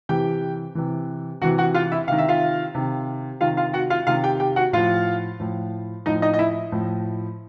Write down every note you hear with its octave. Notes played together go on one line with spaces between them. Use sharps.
C3 E3 G4 G5
C3 E3
C3 E3 F#4 F#5
F#4 F#5
F4 F5
E4 E5
C3 D#3 F5
E5
F4 F5
C3 D#3
C3 D#3 F4 F5
F4 F5
F#4 F#5
F4 F5
C3 D#3 F4 F5
G4 G5
G4 G5
F#4 F#5
A2 F3 F4 F5
A2 F3
A2 F3 D#4 D#5
D#4 D#5
D#5
E4 E5
A2 F3